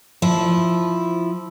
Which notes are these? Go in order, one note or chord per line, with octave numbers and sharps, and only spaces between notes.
F3 E4